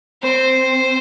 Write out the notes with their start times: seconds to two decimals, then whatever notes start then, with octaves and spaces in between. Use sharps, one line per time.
0.22 C4 C5